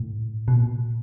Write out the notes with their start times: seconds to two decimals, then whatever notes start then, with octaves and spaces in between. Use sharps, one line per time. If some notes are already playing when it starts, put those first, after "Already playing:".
Already playing: A2
0.48 B2
0.55 A#2